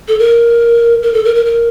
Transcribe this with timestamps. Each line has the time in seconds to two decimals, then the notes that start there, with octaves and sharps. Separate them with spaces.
0.08 A4
0.19 A#4
1.03 A#4
1.14 A4
1.25 A#4
1.35 A#4
1.46 A#4